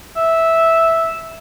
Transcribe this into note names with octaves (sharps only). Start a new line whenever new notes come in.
E5